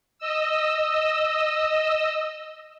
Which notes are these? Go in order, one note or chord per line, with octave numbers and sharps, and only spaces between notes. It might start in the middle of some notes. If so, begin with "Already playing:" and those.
D#5 E6